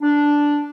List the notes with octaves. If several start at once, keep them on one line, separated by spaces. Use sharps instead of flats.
D4